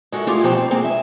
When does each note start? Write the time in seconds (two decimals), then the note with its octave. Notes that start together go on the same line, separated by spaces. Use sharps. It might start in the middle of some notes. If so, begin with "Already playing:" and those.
0.12 G#3 F#4 A4 A#4 E5
0.27 A3 E4 F4 G4 G#4
0.43 D2 B2 F3 D#4 G5 A5
0.57 C4
0.71 G#3 A#3 C4 G#4
0.83 G2 E5 G#5